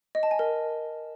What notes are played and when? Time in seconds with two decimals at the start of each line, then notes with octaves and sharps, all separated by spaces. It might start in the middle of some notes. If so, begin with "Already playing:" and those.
0.15 D#5
0.23 A5
0.31 G#5
0.39 A#4